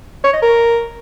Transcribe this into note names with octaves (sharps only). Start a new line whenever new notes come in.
C#5
D#5
A#4